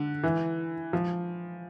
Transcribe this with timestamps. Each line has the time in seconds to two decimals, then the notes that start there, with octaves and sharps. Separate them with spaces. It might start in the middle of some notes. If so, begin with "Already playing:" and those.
Already playing: D3
0.23 E3
0.93 F3